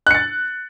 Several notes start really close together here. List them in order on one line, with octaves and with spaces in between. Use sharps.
F#6 C#7 A6